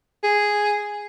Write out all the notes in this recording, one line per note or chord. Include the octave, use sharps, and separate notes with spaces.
G#4